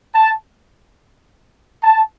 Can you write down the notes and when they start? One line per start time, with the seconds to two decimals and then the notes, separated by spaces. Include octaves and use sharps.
0.15 A5
1.84 A5